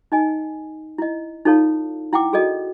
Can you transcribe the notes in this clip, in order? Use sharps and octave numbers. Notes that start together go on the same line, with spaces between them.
D#4 D#5 G#5
E4 D#5
D#4 F4 A4 C#5 F5 A5
E4 F#5 G5 D6
F#4 G#4 A4 D5 D#5